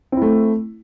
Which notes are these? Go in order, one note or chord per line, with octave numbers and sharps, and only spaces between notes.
A3 C4 E4